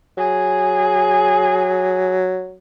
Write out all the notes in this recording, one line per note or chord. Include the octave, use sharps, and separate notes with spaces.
F#3 G#4